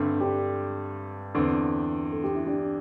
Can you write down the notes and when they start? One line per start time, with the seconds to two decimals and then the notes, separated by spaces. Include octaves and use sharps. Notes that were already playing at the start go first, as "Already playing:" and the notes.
Already playing: G2 D3 A3 C4
0.20 D4 G4
1.35 E2 D3 C4
2.12 A4
2.24 G4
2.34 E4
2.46 D4 G4